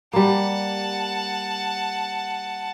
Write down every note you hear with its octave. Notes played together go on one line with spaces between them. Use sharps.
G3 A#3 F#5 A5